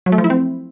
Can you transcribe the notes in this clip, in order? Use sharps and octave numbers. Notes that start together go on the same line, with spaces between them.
F#3
A3
F3
E4
C4